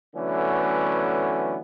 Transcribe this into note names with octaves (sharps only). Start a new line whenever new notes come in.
D3 E3 F#3 A3 B3 C#4